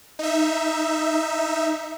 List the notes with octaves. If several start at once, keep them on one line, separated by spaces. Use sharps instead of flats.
D#4 E5